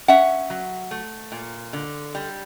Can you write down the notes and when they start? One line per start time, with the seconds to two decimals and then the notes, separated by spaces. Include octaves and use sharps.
0.08 C#4 E5 F#5
0.50 F#3
0.91 A3
1.32 A#2
1.73 D3
2.15 G3